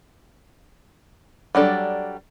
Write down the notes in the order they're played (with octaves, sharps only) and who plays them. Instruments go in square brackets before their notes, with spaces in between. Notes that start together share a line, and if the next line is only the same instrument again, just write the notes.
[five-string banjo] F#3 G3 D4 A4